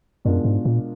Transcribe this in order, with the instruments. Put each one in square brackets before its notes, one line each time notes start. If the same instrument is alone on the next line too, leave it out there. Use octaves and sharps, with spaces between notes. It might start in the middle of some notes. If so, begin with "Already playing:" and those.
[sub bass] F#2 [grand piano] B2 G#3 D4 F4 A#4
[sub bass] G#2
A#2